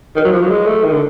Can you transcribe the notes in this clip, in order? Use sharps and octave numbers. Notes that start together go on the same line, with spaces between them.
D#3
F#3
F3
F#3
G#3
A3
D#3
D3